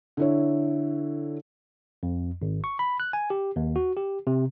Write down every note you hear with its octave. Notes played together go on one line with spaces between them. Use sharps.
D3 E4 C#5
F2
G#1
C#6
B5
F#6
G#5
G4
D#2
F#4
G4
C3